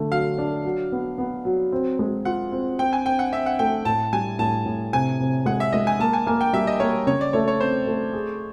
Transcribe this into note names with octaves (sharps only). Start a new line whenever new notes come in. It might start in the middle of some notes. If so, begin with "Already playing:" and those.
Already playing: D3 A3
F#3 F5
D4
F#3
B3
B3
F#3
C4
G#3
F4 F#5
C4
C4 G5
G#5
C4 G5
F#5
C4 E5
F#5
A3 G5
A2 A5
G3 G#5
A2 A5
A2
C3 G#5
C3
G#3 F#5
E5
G#3 D#5
G#5
A#3 A5
G#5
A#3 G#5
G5
G3 E5
D#5
A#3 C#5
C#3 C#5
D5
A3 C#5
C#5
C4 C5
A3
G#4